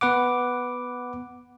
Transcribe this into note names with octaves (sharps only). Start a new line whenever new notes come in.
B3 B4 F#5 D6